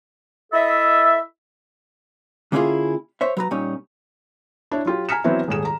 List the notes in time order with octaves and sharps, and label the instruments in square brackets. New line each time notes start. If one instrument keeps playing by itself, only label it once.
[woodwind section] E4 A4 D#5 E5
[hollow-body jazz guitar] D3 A#3 C#4 E4 F4 G#4
C5 C#5 E5
F#3 B4 A#5
A#2 G3 C#4 D#4
[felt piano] D4 E4 C#5
F#3 F4 G4
G#5 A#5 F6 B6 C#7 E7
E3 F#3 B3 C4 E4
D#1 G#2 G#4 E7
A#5